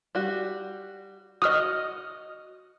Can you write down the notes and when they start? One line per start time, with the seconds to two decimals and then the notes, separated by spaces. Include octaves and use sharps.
0.15 G3 F#4
1.42 F#4 D#5 D#6 F6